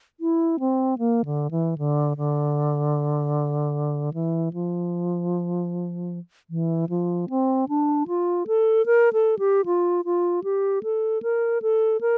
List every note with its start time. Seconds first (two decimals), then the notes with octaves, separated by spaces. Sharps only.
0.20 E4
0.60 C4
0.98 A#3
1.25 D3
1.51 E3
1.78 D3
2.17 D3
4.14 E3
4.53 F3
6.50 E3
6.89 F3
7.30 C4
7.69 D4
8.08 F4
8.47 A4
8.86 A#4
9.13 A4
9.39 G4
9.65 F4
10.05 F4
10.44 G4
10.83 A4
11.23 A#4
11.62 A4
12.01 A#4